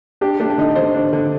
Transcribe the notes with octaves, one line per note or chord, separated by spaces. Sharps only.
D4 G4
A3 D4
D4
D3 D#4
D3 C5
D4
D3